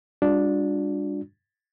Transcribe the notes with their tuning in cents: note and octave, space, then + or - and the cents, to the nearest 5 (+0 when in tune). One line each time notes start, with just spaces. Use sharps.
G3 +35 D4 +0 F4 +45